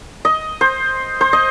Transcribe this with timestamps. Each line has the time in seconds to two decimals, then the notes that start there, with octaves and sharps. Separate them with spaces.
0.25 D#5
0.61 C5
1.21 C5
1.33 D#5